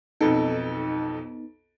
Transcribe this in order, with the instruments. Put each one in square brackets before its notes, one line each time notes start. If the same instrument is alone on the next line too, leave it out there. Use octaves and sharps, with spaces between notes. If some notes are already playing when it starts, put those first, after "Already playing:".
[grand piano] B1 F2 A4 [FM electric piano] B3 D#4